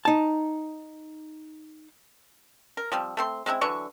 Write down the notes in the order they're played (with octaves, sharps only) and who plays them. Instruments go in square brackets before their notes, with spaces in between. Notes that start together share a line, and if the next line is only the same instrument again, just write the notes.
[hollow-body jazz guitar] D#4 A5
[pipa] A#4
F3 G3 C4
A3 C4 C6
G#3 C4 D4 E4
D3 E3 F#3 C#6